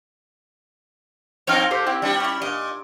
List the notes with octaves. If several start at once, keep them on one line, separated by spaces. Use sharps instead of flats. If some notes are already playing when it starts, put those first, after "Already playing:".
F3 C4 D#4 C#5 G5 F6
A#2 G4 A4 C5
C4 E4 G4
G3 D4
C#4 E4
A#2 D#5